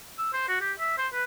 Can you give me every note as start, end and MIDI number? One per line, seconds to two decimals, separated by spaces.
0.18 0.30 88
0.33 0.45 72
0.48 0.58 66
0.61 0.72 67
0.79 0.96 76
0.98 1.08 72
1.13 1.24 71